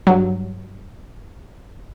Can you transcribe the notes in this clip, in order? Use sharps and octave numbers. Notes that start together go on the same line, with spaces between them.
G2 F#3